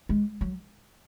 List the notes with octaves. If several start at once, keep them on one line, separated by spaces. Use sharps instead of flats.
G#3
F#3